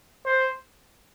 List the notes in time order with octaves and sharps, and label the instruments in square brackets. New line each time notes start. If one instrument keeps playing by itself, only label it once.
[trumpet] C5